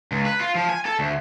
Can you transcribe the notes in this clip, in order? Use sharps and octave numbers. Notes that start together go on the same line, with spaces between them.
C#2
B4
F4
F3
G#5
A4
D2